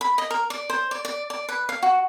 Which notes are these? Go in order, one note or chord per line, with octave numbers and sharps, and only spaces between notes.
B5
D#5
A#4
D5
C5
D5
D5
D5
B4
F5
F#4